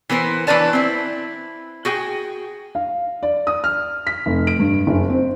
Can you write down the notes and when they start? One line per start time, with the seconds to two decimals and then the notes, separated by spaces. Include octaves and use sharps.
0.09 E3 B3 A#4 C5
0.47 E3 D4 B4 C#5 D5 A5
0.73 C4 E4
1.85 F#4 G#4 G5
2.75 F5
3.23 D5
3.47 D#6
3.64 F6
4.07 B6
4.26 F1
4.47 D7
4.59 G2
4.87 F#1
5.09 C4